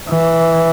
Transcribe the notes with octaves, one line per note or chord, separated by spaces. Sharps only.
E3